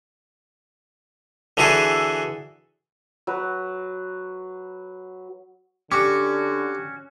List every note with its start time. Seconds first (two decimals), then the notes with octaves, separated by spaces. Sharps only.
1.57 D3 E3 E4 F#4 G#4 A4
3.27 F#3 B4
5.92 D3 C#4 F#4 G4 D6